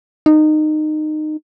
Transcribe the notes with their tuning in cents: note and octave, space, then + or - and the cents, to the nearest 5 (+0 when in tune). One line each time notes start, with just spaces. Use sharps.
D#4 -20